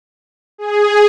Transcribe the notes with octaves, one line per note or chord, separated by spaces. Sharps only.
G#4